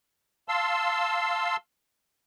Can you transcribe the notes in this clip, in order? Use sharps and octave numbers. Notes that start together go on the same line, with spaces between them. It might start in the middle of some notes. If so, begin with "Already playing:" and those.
F5 A5 C6 E6